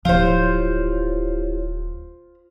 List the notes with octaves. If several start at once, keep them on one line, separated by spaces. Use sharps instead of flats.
D1 F3 E4 F4 G4 C5 C#5